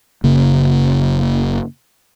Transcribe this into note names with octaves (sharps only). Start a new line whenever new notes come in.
F#1 C#3 A#3